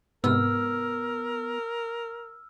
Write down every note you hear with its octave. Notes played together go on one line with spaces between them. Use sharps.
G#2 C3 B3 A#4 E6 F6